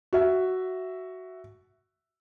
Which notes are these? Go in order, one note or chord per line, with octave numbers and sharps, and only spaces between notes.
F#4 E5